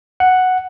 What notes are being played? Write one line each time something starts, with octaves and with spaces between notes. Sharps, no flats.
F#5